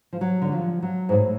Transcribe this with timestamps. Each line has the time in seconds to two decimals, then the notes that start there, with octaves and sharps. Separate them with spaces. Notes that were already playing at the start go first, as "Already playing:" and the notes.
0.13 F3
0.21 F#3
0.42 D3
0.52 F3
0.82 F#3
1.09 G#2
1.12 A2